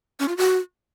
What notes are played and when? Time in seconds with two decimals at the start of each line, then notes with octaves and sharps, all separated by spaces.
0.20 C#4
0.28 F4
0.37 F#4